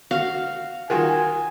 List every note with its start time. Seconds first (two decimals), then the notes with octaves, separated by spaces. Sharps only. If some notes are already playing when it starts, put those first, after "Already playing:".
0.11 F#4 F5
0.90 D#3 F4 F#4 G#5